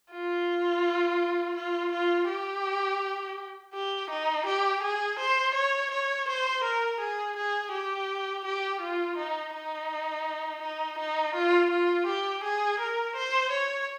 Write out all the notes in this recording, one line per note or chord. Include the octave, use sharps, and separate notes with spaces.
F4
F4
F4
G4
G4
D#4
G4
G#4
C5
C#5
C#5
C5
A#4
G#4
G#4
G4
G4
F4
D#4
D#4
D#4
D#4
F4
F4
G4
G#4
A#4
C5
C#5